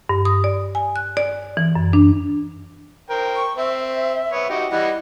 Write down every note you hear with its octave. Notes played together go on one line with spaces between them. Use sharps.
G2
D#6
D5
G#5
F#6
D5
E3
F#2
D4
A#4 C5 G5
C#6
C4 E5
B3 C#5
D#4 F#4 G4
E3 G3 D#5 F#5